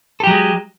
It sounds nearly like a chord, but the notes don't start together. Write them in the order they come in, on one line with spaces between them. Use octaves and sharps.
A4 G4 F#3 G#3